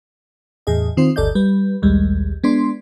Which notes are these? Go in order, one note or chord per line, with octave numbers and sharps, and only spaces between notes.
E2 A2 G#4 D#5
D#3 C4 F4 C5
G1 D2 A4 D5 D#5 G6
G3 B4
A#1 D#2 G3 G#3
G#3 B3 D4 D5 C6